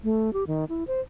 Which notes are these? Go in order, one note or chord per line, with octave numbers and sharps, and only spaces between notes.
A3
G4
D#3
E4
C5